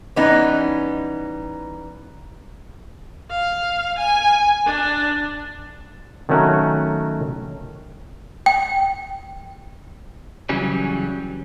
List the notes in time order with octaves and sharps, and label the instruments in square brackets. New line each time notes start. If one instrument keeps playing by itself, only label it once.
[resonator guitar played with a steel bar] E3 G3 B3 C#4 D#4
[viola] F5
G#5
D4
[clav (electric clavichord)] D#3 F#3 A3 C#4 F#4 A#4
[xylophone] G5
[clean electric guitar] C#3 E3 F#3 G3 C#4